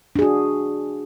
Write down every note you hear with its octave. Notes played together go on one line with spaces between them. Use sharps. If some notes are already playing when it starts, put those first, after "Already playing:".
D4 F#4 G#4